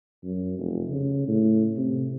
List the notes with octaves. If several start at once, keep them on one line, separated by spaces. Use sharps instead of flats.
F#2
F1
C#3
A2
C3